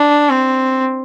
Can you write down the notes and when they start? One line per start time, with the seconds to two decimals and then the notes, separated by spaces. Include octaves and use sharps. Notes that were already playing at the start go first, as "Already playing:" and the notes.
Already playing: D4
0.30 C4